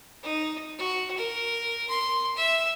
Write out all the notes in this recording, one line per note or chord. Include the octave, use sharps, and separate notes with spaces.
D#4
F#4
A#4
C6
E5